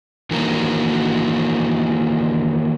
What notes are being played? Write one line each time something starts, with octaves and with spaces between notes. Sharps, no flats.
D#3 E3 A#3 D#4 F#4 A#4